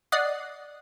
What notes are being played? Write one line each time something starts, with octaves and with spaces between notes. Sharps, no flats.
D5 D#5 F#5 D#6 C7